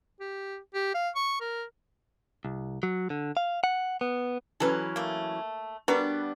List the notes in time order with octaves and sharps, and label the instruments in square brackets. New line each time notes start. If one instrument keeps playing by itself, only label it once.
[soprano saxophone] G4
G4
F5
C#6
A#4
[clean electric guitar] C2
F#3
D3
F5
F#5
B3
[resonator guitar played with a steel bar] E3 F#3 C#4 [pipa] A4 B4
[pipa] A3 A#3
[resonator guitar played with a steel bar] G3 B3 D4 [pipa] F#4 A#4 B4